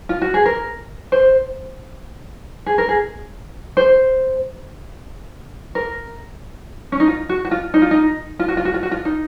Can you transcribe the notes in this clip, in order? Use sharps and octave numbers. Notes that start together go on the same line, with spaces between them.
F4
F#4
G#4
A#4
C5
G#4
A#4
G#4
C5
A#4
C#4
D#4
F4
F#4
F#4
F4
D#4
F4
D#4
F4
F#4
F4
F#4
F4
F#4
F4
D#4